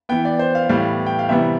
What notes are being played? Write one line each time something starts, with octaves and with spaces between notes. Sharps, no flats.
E3 B3 G5
D5
C5
F5
A2 E3 G3 B3 F5
G5
F5
C3 E3 G3 B3 E5